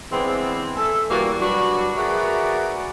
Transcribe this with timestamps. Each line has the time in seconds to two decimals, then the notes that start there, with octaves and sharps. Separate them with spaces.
0.12 E3 G#3 B3 C4 D4 E4
0.77 A4 E5 G#5
1.10 E3 G3 A#3 F#4 D5
1.41 F#3 G3 D4 F#4 B4
1.97 F#4 G#4 A#4 B4 D5 E5